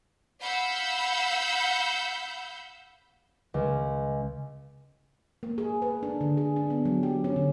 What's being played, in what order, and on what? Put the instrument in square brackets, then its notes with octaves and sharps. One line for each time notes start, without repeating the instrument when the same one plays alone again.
[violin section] F5 F#5 B5 E6 G6 C#7
[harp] C#2
[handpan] A#3
G#4
B4
D4
D3
G#4
D4
B3
F#3
G4
C#4
D3